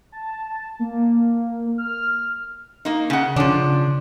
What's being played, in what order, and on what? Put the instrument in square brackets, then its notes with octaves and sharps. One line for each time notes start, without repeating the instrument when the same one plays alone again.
[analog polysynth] A5
A#3
F6
[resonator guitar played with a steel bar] A#3 D#4
C#3 F#5
[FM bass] C#3 [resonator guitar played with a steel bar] F3 D4